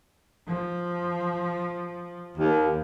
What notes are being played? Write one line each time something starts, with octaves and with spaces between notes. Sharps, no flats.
F3
D#2